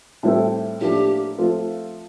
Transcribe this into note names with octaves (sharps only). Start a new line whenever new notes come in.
A2 G3 C4 E4 A4
A2 F3 A#3 D4 G4
F3 A3 C4 F4